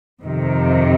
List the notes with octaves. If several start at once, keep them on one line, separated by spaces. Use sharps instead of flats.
F2 C3 D#3